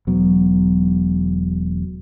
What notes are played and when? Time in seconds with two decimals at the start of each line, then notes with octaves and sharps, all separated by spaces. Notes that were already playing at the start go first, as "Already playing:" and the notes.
0.07 E1 F#3 B3